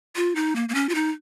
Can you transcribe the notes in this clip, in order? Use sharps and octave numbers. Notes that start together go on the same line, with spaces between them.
F4
D#4
A#3
A#3
C#4
F4
D#4